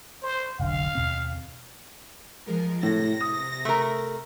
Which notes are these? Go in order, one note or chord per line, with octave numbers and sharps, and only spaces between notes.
C5
F1 B1 D3 F5
D#2 B2 C4
F3 G#3 A#4
A2 C3 A#6
D#6
A3 A#4